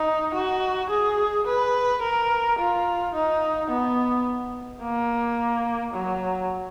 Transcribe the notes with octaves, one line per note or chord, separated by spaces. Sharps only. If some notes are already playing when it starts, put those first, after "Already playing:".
Already playing: D#4
F#4
G#4
B4
A#4
F4
D#4
B3
A#3
F#3